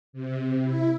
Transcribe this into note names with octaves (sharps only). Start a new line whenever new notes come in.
C3
E4